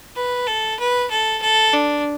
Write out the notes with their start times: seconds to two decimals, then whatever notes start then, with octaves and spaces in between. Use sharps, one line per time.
0.16 B4
0.47 A4
0.80 B4
1.11 A4
1.42 A4
1.73 D4